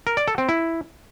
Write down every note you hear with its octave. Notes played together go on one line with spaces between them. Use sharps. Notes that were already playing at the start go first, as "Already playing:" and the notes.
A#4
D5
A4
C4
E4